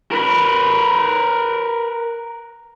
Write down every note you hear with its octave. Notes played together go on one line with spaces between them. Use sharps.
A#4 B4